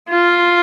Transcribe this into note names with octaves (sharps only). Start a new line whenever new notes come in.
F4